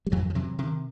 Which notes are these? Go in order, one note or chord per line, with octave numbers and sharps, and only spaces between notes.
G3
F2 E3 F#3
F3
C3 E3 F#3
C3 D#3